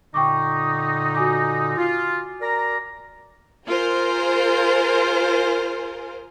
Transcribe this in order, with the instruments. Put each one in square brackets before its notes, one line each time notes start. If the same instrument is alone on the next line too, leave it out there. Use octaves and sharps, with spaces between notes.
[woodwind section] A#2 D3 D#4 [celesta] G5 C#6 D6
[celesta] F#4 G#5 D6
[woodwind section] F4
A#4 D5 A#5
[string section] F4 G#4 A#4 C5